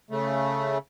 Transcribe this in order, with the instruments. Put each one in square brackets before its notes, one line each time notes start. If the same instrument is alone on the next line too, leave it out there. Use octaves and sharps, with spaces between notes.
[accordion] C#3 A3